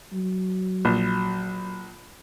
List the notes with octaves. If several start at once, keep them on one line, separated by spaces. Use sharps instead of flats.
F#3
A#1